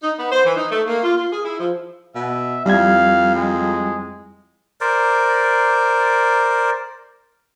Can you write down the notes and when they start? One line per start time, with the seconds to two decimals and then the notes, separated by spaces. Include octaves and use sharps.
0.03 D#4
0.19 B3
0.32 C5
0.46 E3
0.57 D#4
0.71 A3
0.87 A#3
1.03 F4
1.17 F4
1.32 G#4
1.45 E4
1.60 F3
2.15 B2 E5
2.66 F2 G3 E4 F5 G#6
3.35 G#3
4.81 A#4 C5 D5